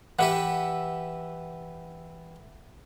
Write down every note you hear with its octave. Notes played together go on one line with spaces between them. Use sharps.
E3 G4 B4 E5 F#5